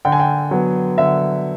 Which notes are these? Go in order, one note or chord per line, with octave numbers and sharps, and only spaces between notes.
D3 G5
G#5
G5
F#3 B3
D3 E5